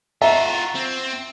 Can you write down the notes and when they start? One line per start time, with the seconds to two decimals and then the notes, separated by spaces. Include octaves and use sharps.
0.21 F4 F#4 E5 A#5
0.75 C4